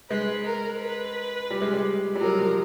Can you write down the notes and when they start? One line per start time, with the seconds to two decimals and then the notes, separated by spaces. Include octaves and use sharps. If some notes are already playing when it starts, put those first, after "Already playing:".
0.10 G#3 B4
0.45 A#4
0.81 B4
1.51 G3
1.62 G#3
1.73 G3
2.15 G3
2.21 F#3 A#4
2.39 F3